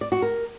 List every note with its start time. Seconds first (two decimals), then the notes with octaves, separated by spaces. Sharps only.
0.01 D5
0.12 F#4
0.22 A#4